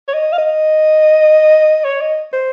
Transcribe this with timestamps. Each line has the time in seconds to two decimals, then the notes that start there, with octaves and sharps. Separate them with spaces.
0.08 C#5
0.14 D#5
0.33 F5
0.38 D#5
1.85 C#5
2.01 D#5
2.33 C5